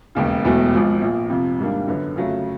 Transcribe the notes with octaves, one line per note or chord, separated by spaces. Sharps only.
E1 D#2 C#3
E1 E2 B2 F#3 A3
G#1 G#2 F3
A#1 A#2 F3
F2 C3 F3
G#2 D#3 G3 A#3 D4
F#2 D3 F#3 B3
F2 C#3 F#3 A3